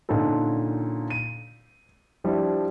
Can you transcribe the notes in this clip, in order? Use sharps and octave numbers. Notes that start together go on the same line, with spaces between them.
A#2 D3 C#4 D#4 A4
D#7
F3 G3 D4 E4